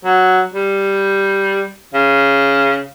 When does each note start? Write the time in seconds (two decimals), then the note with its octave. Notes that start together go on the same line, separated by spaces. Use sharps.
0.05 F#3
0.54 G3
1.94 C#3